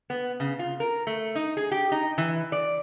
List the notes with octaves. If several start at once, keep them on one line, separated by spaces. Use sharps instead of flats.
B3
C#3
F4
A#4
A3
D#4
G#4
G4
D#4
E3
D5